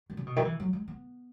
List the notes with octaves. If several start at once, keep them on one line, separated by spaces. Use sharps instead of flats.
D#3
C#3
B2
D#3
F#3
E3
F#3
G#3
B3